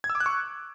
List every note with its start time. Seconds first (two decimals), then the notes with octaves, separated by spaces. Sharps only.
0.04 G#6
0.10 E6
0.15 D6
0.20 F#6
0.26 C#6